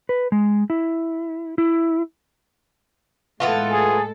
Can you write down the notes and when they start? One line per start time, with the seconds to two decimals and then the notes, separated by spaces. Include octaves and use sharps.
0.09 B4
0.32 G#3
0.70 E4
1.58 E4
3.40 A2 E3 G#3 B3 F4 A4
3.72 G#4